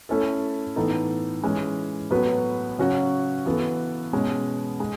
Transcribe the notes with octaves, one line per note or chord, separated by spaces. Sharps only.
A3 C#4 E4 A4
A2 E3 B3 D#4 A4
E3 G#3 C#4
A2 F#3 B3 F#4 B4
C#3 F#3 C#4 F#4
E3 B3 F#4 A4
B2 G#3 C#4
G#3